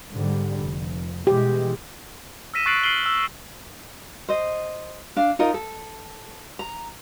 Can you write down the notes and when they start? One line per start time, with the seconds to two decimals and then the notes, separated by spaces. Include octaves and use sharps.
0.12 G#2 D3 G3
0.58 F1
1.27 B2 E3 G#3 G4
2.54 E6 F6 A#6 B6 D#7 E7
2.66 C#6 F#6 A6 C7 D7 F#7
2.83 F6 C7 D7 D#7 F#7 G7
3.06 E6
4.29 C5 D#5
5.16 D4 F5
5.39 D#4 F4 A#4 D#5
5.54 A4
6.59 A#5